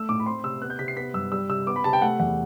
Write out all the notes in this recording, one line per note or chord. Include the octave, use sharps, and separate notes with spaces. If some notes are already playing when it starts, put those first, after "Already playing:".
Already playing: A3 E6
A2 D6
B5
C4 C6
C3 E6
B3 F#6
G6
C3 B6
C7
B3 B6
G2 E6
G3 E6
C3 E6
B3 D6
B5
C3 A5
G5
A3 F#5
E2 F#5